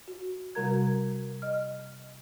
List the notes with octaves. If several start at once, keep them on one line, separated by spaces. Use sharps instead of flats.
F#4
C3 G3 F#4 A#4 A#5 G#6
D#5 F6